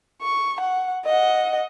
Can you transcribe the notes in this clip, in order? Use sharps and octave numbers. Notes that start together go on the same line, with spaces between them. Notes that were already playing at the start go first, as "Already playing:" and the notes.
C#6
F#5
D#5 F#5